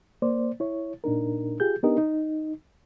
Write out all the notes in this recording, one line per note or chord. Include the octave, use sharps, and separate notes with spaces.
A#3 C5 D5
E4 C#5
A#2 D4 D#4 A#4
F4 G4 G#4 G6
B3 D4 D#4 G4 A#4 D#5
D#4